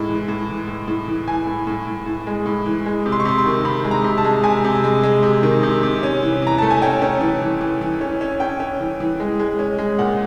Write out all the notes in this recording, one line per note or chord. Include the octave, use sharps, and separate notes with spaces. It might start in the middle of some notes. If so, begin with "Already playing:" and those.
Already playing: A2 G#3
E3
A2
E3
A2
A2
E3
E3 G#5
A2
A2
A2
A2
G#3
A2
E3
G#3
C3
C6
C#6
C3 C6
C6
D#3
C3 B5
G#3
A#5
C3
A5
G#3
C3 G#5
C3
G#3
G#3
C3
D#3
C3
C3
C#4
E3
E3 A#5
A3 A5
G#5
C#4 G5
C#4
E3
E3
E3
E3
C#4
C#4
C#4 G5
C#4
E3
E3
G#3
G#3
C#4
G#3
A#2 F#5